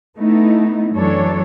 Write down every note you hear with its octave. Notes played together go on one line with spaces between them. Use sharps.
A3 B3 D#4 E4
F#2 E3 F#3 D4 A4 C#5